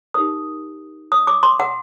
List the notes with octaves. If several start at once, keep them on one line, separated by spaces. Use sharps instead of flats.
D#4 G4 A#4 D#6
D#6
D6
C6
F#5